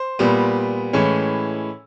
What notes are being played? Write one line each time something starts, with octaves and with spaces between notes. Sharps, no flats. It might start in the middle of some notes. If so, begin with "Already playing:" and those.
Already playing: C5
A#2 G3 B3
A2 E3 G#3 C#4